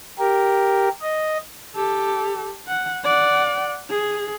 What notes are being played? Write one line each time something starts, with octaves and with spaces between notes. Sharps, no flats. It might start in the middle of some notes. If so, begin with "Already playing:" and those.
G4 A#4
D#5
G4 A4
F#5
D5 F#5
G#4